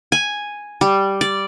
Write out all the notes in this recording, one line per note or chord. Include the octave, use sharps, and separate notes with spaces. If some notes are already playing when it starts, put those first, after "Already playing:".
G#5
G3
D5